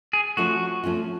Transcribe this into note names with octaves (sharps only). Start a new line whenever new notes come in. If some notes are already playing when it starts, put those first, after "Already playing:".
G#4
F3 A3 C#4 F4 F#4
F3 A3 C#4 F4